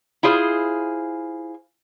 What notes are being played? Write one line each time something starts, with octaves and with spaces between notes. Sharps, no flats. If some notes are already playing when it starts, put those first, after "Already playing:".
E4 F4 G#4 C5